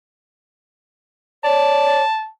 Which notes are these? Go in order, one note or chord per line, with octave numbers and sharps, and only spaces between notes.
C#5 D5 A5